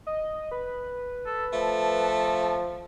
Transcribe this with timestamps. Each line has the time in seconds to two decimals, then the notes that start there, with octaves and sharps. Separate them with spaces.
0.07 D#5
0.51 B4
1.26 A4
1.53 F3 A3 A5